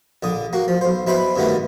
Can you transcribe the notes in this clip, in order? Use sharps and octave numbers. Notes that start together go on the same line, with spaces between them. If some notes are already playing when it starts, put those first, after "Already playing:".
A#1 D3 D#6
A#3 F#4
F3
B1 C5
B2 E4 B4 C5 B5
G2 B2 D3 D#3 A3 B3